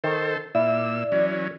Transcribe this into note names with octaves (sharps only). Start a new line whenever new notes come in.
D#3 A4 C5
A#2 E4 D5 E6
E3 F#3 C#4